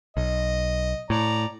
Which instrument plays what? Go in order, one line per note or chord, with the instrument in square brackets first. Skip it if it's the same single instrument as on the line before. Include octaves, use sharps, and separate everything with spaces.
[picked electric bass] B1 [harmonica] D#5
[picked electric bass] A2 [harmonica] D5 A#5